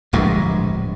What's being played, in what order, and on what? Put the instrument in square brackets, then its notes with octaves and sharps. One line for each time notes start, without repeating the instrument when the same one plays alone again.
[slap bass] D1 A#1 G2 G#3